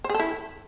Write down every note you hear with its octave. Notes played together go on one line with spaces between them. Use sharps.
C5
G#4
A4
E4